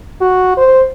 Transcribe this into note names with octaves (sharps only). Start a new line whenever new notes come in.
F#4
C5